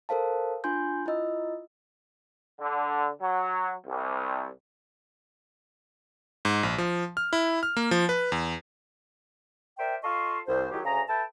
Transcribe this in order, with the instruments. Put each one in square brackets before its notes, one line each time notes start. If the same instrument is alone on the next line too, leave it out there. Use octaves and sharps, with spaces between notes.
[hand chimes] A4 A#4 C5 F5 A5
D4 F4 G#5 C6 G6
E4 F4 D#5 E6
[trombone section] D3
F#3
C2
[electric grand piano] G#2
A#1
F3
F6
E4
F6
A#3
F3
B4
E2
[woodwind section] A#4 C5 D5 E5 G5
F4 A4 D#5 F5 C6 C#6
C2 C5
D#3 F#3 G#3 E4 G4
D2 C#3 G#4 A#5
A4 B4 E5 G5 A5